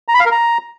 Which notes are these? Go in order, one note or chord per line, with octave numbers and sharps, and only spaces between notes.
A#5
B5
F5
A#4
A#5